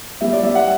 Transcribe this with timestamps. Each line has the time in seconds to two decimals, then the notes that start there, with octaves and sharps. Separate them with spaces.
0.21 G3 E5
0.33 D5
0.43 G3 E5
0.55 F#5